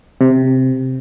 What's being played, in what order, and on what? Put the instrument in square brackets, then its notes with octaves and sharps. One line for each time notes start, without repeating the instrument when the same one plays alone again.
[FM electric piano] C3